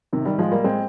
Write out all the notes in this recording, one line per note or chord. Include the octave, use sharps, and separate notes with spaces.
C3 D#3
D#3 G3
F3 G#3
G3 A#3
G#3 C4